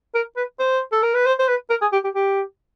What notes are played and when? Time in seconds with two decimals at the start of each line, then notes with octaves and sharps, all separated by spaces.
0.15 A#4
0.36 B4
0.59 C5
0.92 A4
1.02 A#4
1.14 B4
1.26 C5
1.39 C5
1.48 B4
1.70 A#4
1.81 G#4
1.93 G4
2.04 G4
2.14 G4